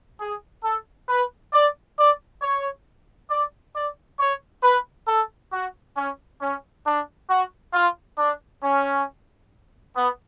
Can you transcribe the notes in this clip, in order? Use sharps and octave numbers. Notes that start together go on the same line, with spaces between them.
G#4
A4
B4
D5
D5
C#5
D5
D5
C#5
B4
A4
F#4
C#4
C#4
D4
F#4
F4
D4
C#4
B3